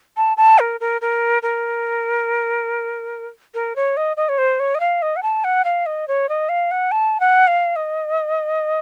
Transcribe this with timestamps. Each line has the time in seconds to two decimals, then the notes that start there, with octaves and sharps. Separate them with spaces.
0.17 A5
0.37 A5
0.59 A#4
0.80 A#4
1.01 A#4
1.43 A#4
3.54 A#4
3.76 C#5
3.97 D#5
4.17 D#5
4.29 C#5
4.38 C5
4.60 C#5
4.75 D#5
4.80 F5
5.02 D#5
5.16 F#5
5.23 A5
5.44 F#5
5.64 F5
5.86 D#5
6.08 C#5
6.29 D#5
6.49 F5
6.71 F#5
6.91 A5
7.20 F#5
7.47 F5
7.76 D#5